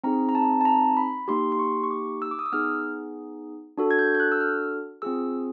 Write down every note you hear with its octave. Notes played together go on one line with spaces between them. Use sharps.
C4 D#4 G#4 A#5
A#5
A5
A5
A#5
B5
A#3 D#4 G4 C6
C6
C#6
C#6
D6
E6
D6
D#6
E6
B3 D#4 G#4 F6
D4 F#4 A4
G#6
G6
G6
F#6
E6
F6
C4 F4 G#4 E6